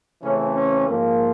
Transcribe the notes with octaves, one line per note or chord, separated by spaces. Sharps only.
C#3 E3 A3 C4 C#4
C#4
G#2 F3 A#3